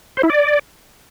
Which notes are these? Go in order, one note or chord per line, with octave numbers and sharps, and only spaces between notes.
C5
E4
D5